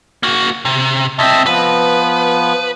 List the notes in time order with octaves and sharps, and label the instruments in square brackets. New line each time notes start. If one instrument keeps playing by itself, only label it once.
[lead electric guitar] A#3 F#4
C3
[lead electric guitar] C#2 C4 [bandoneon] D#5 E5 A5
[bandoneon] F3 B3 [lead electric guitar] B4